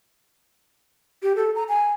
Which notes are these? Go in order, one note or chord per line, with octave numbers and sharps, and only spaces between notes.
G4
A4
A#5
G#5